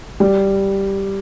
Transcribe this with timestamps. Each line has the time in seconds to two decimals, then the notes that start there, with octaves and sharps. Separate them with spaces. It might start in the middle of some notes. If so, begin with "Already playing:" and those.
0.20 G3